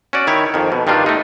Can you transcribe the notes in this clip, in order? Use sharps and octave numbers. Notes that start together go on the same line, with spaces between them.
C#4 F#4 D5
D#3 E4 C#5
F2 D#3
B2
G2 D#3 G3 D4 F4
A3 D#4